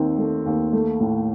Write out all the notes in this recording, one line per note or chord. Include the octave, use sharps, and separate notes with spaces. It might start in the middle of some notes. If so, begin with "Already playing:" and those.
Already playing: D#2 D#3 C4
A3
D#2
A3
A2